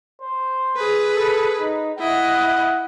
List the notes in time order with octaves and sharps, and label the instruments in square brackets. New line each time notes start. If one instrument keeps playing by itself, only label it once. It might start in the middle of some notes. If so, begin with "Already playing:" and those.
[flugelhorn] C5
[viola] G#4 B4
[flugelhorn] A4
D#4
[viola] E4 D#5 [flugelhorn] F#5